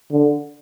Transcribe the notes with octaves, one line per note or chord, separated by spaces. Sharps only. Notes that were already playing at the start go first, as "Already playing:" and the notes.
D3